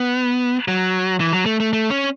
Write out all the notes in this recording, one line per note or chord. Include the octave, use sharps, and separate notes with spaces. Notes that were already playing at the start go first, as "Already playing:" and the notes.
Already playing: B3
F#3
E3
F#3
A3
A3
A3
C#4